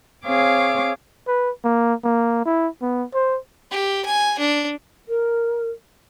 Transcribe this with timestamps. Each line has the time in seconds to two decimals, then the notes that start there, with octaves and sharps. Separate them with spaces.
0.25 C4 G#4 C#5 F5 D6
1.27 B4
1.64 A#3
2.04 A#3
2.46 E4
2.82 B3
3.14 C5
3.71 G4
4.05 G#5
4.39 D4
5.08 A#4